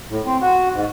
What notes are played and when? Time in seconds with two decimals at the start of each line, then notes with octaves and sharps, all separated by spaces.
0.10 A2
0.26 C4
0.41 F#4
0.74 G#2